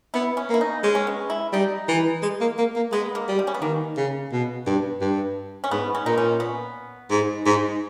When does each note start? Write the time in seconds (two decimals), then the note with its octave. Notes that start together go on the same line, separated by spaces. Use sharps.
0.14 B3 E4
0.37 C#4
0.49 A#3 E4
0.61 D#4
0.83 G#3 C#4
0.95 C#4
1.07 B3
1.30 E4
1.53 G3 D#4
1.88 E3
2.22 G#3
2.41 A#3
2.58 A#3
2.76 A#3
2.92 G#3 B3
3.15 A#3
3.28 G3
3.39 G3
3.47 C#4
3.54 B3
3.61 D#3 A#3
3.97 C#3
4.32 B2
4.66 G2
5.01 G2
5.64 C#4
5.71 G#2 B3
5.95 C#4
6.05 A#2 D#4
6.18 C#4
6.40 B3
7.10 G#2
7.45 G#2